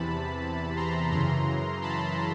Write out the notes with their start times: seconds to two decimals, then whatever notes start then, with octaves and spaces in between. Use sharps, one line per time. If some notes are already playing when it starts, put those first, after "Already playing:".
Already playing: E2 C3 E3 A5 B5
0.76 A#5 C6
1.12 F#2 C#3 E3 A#5 C6
1.82 A5 B5